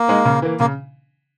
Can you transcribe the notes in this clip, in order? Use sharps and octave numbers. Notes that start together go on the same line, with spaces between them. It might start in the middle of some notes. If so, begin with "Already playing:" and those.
Already playing: A#3
G#3 D#4
C#3
E3 A#3
C#3 A#3